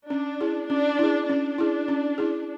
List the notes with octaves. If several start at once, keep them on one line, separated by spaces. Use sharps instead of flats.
C#4 D4
E4 G#4
C#4 D4
E4 G#4
C#4 D4
E4 G#4
C#4
E4 G#4